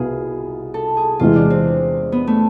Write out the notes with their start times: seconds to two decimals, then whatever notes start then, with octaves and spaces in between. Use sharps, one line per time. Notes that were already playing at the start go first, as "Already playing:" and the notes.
Already playing: C2 B2 B3 F4 G#4
0.74 A4
0.97 G#4
1.19 E2 C3 E3 G#3 F4
1.36 D4
1.50 C4
2.12 B3
2.27 A3